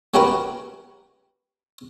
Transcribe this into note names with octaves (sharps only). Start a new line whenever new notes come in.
A3 C#4 F#4 G4 A#4 B4